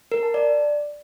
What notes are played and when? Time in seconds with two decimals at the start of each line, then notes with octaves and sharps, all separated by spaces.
0.12 A#4
0.23 A5
0.34 D5